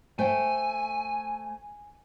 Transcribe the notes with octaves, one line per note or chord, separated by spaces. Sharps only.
A3 C5 G5 G#5